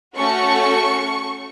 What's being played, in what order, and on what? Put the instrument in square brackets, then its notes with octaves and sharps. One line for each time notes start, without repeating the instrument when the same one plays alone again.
[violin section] A3 C#4 F#4 A4 C#6